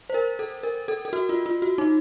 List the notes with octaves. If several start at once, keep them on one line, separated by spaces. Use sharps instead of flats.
C5
A#4
A4
A#4
A4
A4
F#4
F4
F4
F#4
D#4